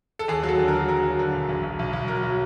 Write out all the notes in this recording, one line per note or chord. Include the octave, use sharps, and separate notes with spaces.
A4
D#2 G#4
F#3 A4
D3
A#4
F#3
F#3 A#4
F#3
D3
E1
B1
B1
B1
B1
F#3 A#4
F#3